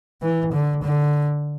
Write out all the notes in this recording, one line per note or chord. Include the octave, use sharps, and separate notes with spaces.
E3
D3
D3